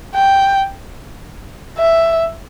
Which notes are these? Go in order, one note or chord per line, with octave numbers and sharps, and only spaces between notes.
G5
E5